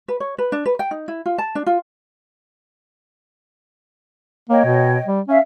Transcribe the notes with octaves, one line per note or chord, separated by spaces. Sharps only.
B4
C#5
B4
D4
B4
G5
D#4
E4
F4
A5
D4
F4
A#3 C#5 D#5 G5
B2
G3
C#4 E5 F5